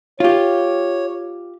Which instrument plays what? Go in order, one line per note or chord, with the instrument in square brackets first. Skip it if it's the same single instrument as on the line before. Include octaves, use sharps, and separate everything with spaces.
[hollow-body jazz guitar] F4 G4 [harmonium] C#5